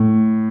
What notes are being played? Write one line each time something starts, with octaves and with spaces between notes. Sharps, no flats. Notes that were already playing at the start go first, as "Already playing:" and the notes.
Already playing: A2